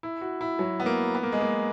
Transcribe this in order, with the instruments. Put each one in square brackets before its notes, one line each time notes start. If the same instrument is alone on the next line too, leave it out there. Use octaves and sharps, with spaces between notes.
[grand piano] E4
F#4
E4
F#3
B3
A#3
B3
A#3
G#3
A#3